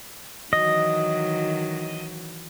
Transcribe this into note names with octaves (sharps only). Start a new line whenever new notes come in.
D#3 E3 F#3 D#5